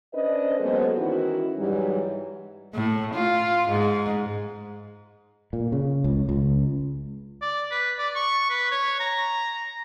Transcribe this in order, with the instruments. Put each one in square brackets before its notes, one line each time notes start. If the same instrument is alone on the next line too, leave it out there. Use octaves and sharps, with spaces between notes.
[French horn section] C#4 D4 B4 C5 D#5
F#3 G#3 A#3 B3 A4 C5
D#3 E3 C#4 E4 F#4
G#2 E3 F#3 G3
[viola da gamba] A2
F4
G#2
[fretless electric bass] A#2
C#3
C#2
C#2
[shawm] D5
B4
D5
C#6
B4
C#5
A#5